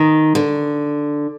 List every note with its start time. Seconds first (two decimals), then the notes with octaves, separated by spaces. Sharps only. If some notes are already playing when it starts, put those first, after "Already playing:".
Already playing: D#3
0.35 D3